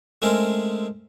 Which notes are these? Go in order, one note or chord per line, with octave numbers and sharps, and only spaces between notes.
G#3 A3 C4 C#4 G#4 A#4